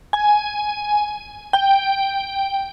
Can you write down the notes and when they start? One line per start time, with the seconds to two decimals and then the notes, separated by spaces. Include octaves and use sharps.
0.13 G#5
1.53 G5